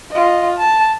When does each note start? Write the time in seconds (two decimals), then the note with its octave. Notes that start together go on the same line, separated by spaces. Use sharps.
0.11 F4 D#5
0.58 A5